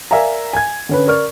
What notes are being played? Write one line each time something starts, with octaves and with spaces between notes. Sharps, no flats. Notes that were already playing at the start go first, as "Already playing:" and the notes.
A#4 D5 E5 F5 G#5 A#5
G#5 G#6
D3 C#4 B4
A#4 D5 C#6 F6